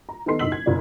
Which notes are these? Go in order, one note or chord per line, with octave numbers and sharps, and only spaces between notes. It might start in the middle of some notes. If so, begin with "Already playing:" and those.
A#5
D#3 B3 D#4 A4 C6 C7
F#1 D#4 C6 E6 B6 F#7
G#6
F#1 D5